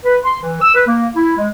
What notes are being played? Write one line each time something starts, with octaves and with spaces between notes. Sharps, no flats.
B4
C6
E3
E6
B4
A#3
E4
G#3